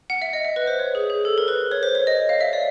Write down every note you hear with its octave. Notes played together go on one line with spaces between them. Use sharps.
F#5
E5
D#5
E5
B4
C5
C#5
G#4
G#4
A4
A#4
B4
C#5
C5
C#5
D#5
F5
E5
D5